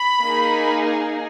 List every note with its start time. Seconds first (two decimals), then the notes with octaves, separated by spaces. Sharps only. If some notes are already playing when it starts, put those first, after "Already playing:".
Already playing: B5
0.23 A#3 D#4 G#4